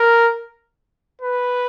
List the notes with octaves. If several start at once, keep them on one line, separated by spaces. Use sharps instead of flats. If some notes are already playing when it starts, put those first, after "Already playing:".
Already playing: A#4
B4